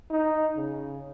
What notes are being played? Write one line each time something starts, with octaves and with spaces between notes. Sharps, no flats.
D#4
C#3